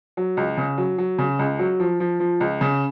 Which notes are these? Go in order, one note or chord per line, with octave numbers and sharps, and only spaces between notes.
F#3
C#2
C#3
F#3
F#3
C#3
C#2
F#3
F3
F3
F3
C#2
C#3